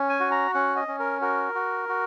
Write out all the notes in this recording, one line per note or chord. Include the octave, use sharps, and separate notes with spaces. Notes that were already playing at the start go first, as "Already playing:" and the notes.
Already playing: C#4
G#5
F#4
A#5
C#4 F#5
D#5
C#4
A#4
F#4 A#4
F#4
F#4